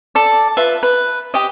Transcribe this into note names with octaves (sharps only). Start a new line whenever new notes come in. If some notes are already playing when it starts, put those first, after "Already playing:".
A4 D5
F4 B4 E5
B4
G4 D#5